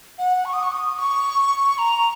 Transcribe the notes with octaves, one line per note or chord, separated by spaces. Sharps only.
F#5
C#6
D#6
C#6
D#6
C#6
A#5